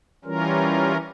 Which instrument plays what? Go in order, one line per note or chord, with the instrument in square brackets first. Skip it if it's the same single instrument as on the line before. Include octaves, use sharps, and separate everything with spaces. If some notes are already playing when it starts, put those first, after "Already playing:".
[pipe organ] E3 G3 C#4 F4 A#4